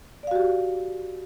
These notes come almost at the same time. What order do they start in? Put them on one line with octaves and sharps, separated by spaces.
D5 F5 F#4 G4